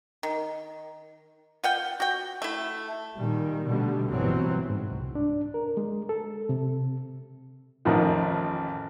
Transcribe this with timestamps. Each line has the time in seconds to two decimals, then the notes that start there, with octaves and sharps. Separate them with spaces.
0.23 D#3
1.64 F4 F#5 G5
2.00 F#4 G5
2.42 A3 E4
3.17 A#2 D#3 G3
3.66 B2 D3 G3 A3
4.10 G1 B2 E3 F#3 C4
4.70 G#2
4.91 C2
5.15 D4
5.54 A#4
5.77 G#3
6.09 A4
6.49 C3
7.85 A1 F2 D#3